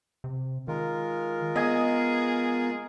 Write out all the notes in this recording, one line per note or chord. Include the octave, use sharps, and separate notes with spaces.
C3
D#3 G#3 F4 A#4
B3 G#4 D#5 G#5